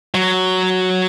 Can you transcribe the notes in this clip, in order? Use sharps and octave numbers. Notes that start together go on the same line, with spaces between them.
F#3